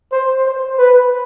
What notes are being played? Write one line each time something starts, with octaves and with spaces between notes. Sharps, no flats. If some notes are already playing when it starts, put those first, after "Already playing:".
C5
C5
B4